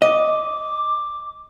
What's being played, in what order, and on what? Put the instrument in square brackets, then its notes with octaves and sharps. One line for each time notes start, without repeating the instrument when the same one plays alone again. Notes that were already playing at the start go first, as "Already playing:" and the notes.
[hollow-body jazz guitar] D#5 [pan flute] D6